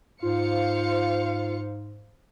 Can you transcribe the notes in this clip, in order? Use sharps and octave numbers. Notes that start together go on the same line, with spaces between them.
G#2 F4 C5 F5 C#7